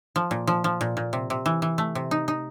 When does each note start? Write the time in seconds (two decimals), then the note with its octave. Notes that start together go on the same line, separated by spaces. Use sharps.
0.16 F3
0.31 A#2
0.47 F3
0.64 F3
0.81 A#2
0.97 A#2
1.13 C3
1.30 C3
1.46 E3
1.62 E3
1.78 A3
1.95 C3
2.11 D#4
2.28 D#4